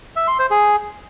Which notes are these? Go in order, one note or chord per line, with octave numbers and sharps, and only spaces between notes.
E5
C6
C5
G#4